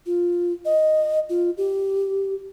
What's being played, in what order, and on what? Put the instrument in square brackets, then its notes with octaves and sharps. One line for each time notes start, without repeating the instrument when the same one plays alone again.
[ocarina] F4
D#5
F4
G4